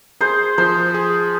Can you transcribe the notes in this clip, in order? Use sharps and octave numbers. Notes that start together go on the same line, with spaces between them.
G#4 C5
F3 C5
G#4